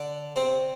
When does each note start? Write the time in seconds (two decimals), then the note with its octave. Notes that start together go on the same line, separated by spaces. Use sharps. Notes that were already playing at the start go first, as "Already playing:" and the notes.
Already playing: D3 D4
0.36 C3 C4